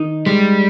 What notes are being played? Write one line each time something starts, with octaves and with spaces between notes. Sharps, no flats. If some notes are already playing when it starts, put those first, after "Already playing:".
Already playing: D#3 D#4
G3 G#3